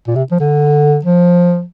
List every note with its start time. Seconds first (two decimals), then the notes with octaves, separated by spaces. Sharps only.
0.07 A#2
0.15 C3
0.31 F3
0.40 D3
1.05 F3